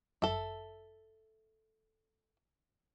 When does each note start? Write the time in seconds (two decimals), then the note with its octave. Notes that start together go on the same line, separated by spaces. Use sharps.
0.22 G1 F#2 A4 E5